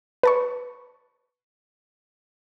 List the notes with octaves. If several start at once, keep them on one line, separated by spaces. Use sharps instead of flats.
B4 A5 C#6